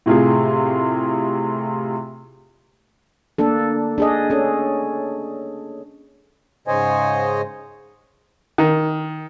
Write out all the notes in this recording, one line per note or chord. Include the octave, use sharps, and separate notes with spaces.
A2 C3 F4 G#4
A#3 D4 A4
D4 G#4 D#5
C#4 A4
G#2 C#3 C5 C#5 D#5 G#5
D#3